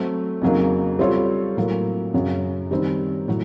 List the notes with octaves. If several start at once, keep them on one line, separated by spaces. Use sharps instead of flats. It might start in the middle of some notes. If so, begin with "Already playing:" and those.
Already playing: F#3 A3 C4
F2 C#3 F#3 A#3 D#4
G3 C4 F4 A4 C#5
A2 F#3 A#3
F#2 C#3 F#3
D#3 G3 C4
A2 F#3